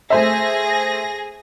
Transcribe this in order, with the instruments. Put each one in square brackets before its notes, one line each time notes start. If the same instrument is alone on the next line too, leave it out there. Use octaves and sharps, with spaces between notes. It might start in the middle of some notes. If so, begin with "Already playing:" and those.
[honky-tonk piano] A3 C5 E5 [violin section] G#4 A#6